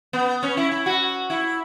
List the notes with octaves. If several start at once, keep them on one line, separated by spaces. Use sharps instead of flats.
B3
C#4
E4
E4
F#4
E4